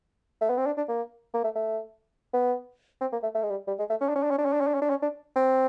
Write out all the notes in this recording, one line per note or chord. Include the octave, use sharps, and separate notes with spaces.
A3
B3
C4
D4
D4
A#3
A#3
A3
A3
B3
C4
A#3
A3
A3
G#3
G3
G3
G#3
A3
C#4
D4
C#4
D4
C#4
D4
C#4
D4
C#4
D4
C#4
D4
C#4
D4
C4